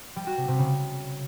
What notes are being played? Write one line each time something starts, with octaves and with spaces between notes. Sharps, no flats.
G3
F#4
C3
C3
C#3